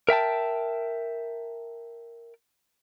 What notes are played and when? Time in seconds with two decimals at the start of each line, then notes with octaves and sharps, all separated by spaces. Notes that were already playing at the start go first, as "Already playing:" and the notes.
0.09 A#4 E5 G5 A5